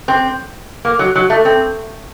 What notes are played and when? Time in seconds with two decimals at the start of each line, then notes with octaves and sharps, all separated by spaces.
0.08 C4
0.85 A#3
0.99 F#3
1.15 F#3
1.30 A3
1.45 C4